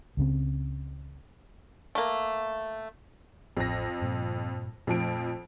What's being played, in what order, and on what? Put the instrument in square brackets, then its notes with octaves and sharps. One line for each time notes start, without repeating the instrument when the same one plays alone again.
[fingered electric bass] C#2 C#3 C4
[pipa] A3 A#3
[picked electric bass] A1 [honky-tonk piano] F2 A#6
[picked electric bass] G2 A#2
[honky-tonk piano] F2 F3 D7 [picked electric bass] A#2 A3